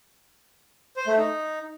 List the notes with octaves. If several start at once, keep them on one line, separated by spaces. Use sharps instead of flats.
C5
A3
D#4